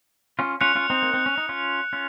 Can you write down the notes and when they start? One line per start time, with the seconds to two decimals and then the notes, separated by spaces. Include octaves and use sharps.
0.39 C#4 F4
0.61 C#4 F4 F#6 C#7 F7
0.75 C#4 F4
0.90 C4 D#4
1.03 A#3
1.14 C4
1.26 C#4
1.37 D#4
1.49 C#4 F4
1.93 C#4 F4